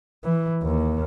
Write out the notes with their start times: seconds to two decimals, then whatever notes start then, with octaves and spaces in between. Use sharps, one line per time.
0.25 E3
0.63 D#2